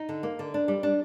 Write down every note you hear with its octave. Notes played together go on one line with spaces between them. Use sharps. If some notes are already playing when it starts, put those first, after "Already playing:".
Already playing: D#4
D3
A#3
D3
D4
G3
D4